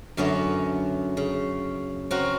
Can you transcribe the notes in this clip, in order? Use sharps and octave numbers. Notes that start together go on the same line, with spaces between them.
F#2 D3 B3 C#4 D#5 E5
C#3
C4 C#4 F#4 A#4